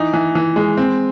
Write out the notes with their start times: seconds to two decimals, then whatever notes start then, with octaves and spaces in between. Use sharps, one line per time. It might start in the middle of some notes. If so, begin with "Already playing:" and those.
Already playing: E3 D#4
0.14 E3
0.35 E3
0.56 G#3
0.77 C4